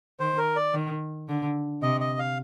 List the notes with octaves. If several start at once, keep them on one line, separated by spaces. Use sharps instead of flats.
D#3 C5
A#4
D5
D#3
D3
C3 D#5
D#5
F5